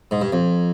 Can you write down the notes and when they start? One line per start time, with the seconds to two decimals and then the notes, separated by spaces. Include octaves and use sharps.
0.11 G#2
0.21 G2
0.32 F2